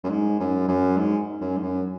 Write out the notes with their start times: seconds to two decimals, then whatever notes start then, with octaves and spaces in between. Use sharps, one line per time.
0.04 F#2
0.10 G#2
0.40 F#2
0.68 F#2
0.97 G#2
1.41 F#2
1.58 G#2
1.63 F#2